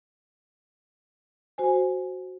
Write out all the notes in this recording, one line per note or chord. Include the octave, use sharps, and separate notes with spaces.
F#4 C5 G#5